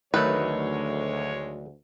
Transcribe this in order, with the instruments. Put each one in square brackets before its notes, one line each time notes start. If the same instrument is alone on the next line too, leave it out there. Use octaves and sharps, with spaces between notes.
[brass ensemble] D2 [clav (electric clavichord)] D#3 F#3 A3 [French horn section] G#3 C#5 [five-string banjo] B4